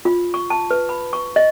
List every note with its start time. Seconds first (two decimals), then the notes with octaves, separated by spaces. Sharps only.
0.05 F4
0.34 C#6
0.50 A5
0.71 B4
0.89 B5
1.13 C#6
1.36 D#5